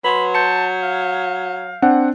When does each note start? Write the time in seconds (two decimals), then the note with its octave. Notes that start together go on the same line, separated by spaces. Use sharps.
0.04 F#3 B4 B5 C6
0.35 A5 G6 C#7
0.83 F5
1.82 C4 D4 F#5